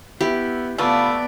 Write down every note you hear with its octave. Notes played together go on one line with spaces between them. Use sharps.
B3 E4 G4
C#3 A3 B3 F4 B4 D5